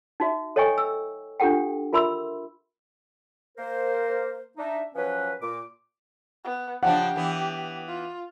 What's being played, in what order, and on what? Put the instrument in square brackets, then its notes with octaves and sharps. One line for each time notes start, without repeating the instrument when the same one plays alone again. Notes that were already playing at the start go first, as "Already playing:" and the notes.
[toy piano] D#4 F#4 E5
A4 C#5 D#5 G5 G#5 C#6
E6
D4 F4 G4 A4 F#5 G5
F4 A#4 E5 B5 C6 E6
[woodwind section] A#3 A#4 C5
D4 D#4 E5
F3 F#3 C#4 B4
A#2 D6
[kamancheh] B3
[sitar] C#3 F3 D4 [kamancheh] G4 [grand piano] F#5
[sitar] E3 B3
[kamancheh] F4